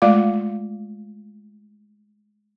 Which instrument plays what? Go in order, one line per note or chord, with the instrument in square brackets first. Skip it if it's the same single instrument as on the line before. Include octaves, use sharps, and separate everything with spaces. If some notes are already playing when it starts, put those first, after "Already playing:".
[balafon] G#3 A3 F4 D5 F5 D6